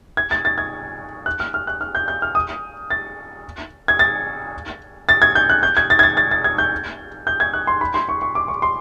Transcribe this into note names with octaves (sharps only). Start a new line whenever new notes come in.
G#6
A6
A6
G#6
F#6
F6
F6
F#6
F6
G6
G6
F6
D#6
A6
G#6
A6
A6
G#6
G6
F#6
G6
G#6
A6
G#6
A6
A6
A6
G#6
G6
G6
G#6
F#6
C6
B5
C6
C#6
C#6
D6
C#6
C6